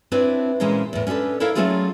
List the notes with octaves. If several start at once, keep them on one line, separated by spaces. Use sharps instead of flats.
C4 D4 E4 B4 C#5
A#2 E3 G#3 C#4 A#4 C5
E2 A2
C#4 D4 G#4 A4 B4
E4 A4 A#4 C#5 F5
F#3 G#3 A3 C#4 F4 G#4